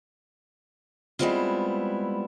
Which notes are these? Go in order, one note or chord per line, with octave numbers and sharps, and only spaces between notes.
G3 G#3 B3 C4 E4 F4